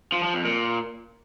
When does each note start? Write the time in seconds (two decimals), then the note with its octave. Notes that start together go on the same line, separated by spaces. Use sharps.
0.12 F3
0.23 F3
0.34 F2
0.45 A#2